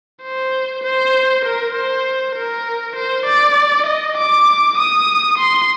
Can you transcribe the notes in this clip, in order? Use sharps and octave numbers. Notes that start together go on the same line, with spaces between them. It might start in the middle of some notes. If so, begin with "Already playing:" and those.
C5
C5
A#4
C5
A#4
C5
D5
D#5
D6
D#6
C6